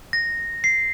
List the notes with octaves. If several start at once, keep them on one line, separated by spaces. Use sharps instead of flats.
A#6
C7